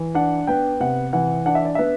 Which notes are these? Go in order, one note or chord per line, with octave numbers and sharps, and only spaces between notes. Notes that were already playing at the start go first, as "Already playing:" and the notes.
Already playing: E3
D4 F#5
B3 G5
C3 F#5
E3 F#5
D4 F#5
E5
D5
B3 E5